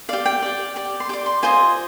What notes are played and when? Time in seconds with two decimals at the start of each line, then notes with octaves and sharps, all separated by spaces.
0.09 G4 D5 F5
0.26 G5
0.42 G4 D5
0.76 G4 D5
1.00 C6
1.09 G4 D5 D6
1.26 C6
1.43 F4 C5 D#5 G#5